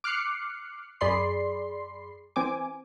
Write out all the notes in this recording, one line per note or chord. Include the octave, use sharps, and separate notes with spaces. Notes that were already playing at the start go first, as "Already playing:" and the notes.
D6 F6 F#6 C7 C#7
F#2 G#4 D5 B5 C6 C7
E3 C4 G#5 D6